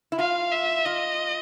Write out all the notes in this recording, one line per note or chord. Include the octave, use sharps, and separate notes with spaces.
E4
F4 F5
E5
F4 D#5